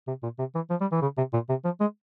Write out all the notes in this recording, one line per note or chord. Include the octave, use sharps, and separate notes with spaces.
C3
A#2
C3
E3
F3
G3
E3
C#3
C3
A#2
C3
F3
G#3